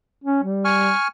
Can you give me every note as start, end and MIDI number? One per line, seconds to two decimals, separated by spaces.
0.24 0.43 61
0.43 0.92 55
0.65 1.08 80
0.65 1.08 85
0.65 1.08 89